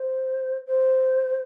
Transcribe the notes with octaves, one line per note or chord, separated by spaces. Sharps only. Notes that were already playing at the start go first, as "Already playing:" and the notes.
Already playing: C5
C5